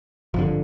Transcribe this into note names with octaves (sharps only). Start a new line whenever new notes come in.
G#1 G2 D3 F3